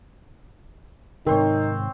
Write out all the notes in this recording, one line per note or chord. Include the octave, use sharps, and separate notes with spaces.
G#2 C3 D#3 C4 D#4 A#4 C5 C#5